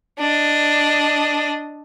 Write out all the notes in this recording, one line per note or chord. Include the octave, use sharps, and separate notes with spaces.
D4 D#5